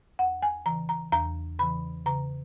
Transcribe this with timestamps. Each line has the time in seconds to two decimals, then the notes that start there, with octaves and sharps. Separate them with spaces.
0.19 E2 F#5
0.42 G#5
0.66 C#3 E3 A#5
0.89 A#5
1.12 E2 A#5
1.59 C#3 E3 B5
2.06 C#3 A#5